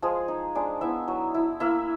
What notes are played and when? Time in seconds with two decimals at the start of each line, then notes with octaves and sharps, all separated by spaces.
0.02 F3 G#3 G#4
0.28 D#4
0.55 G#3 D4 D5
0.81 B3 E4 E5
1.08 F#3
1.34 E4
1.60 A#3 E4 E5